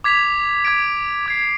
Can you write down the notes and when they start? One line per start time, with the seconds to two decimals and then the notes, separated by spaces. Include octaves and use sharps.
0.04 D6 G#6 B6 F7
0.65 D6 G#6 B6 D7
1.26 D6 G#6 C7